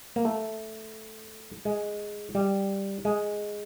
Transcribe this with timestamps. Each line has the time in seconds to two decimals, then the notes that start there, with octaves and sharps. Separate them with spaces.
0.16 A#3
0.25 A3
1.65 G#3
2.35 G3
3.05 G#3